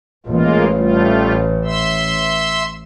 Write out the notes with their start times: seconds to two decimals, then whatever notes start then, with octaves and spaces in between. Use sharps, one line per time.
0.26 A1 G#3 A#3 F4
0.75 G3 A3 F4
1.65 E5 C6 E6